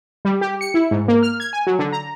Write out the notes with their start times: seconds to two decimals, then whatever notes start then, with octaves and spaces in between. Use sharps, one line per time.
0.25 G3
0.41 G4
0.61 C#7
0.74 E4
0.91 G#2
1.08 A#3
1.23 F6
1.40 G#6
1.53 G#5
1.67 F#3
1.79 D3
1.92 A#5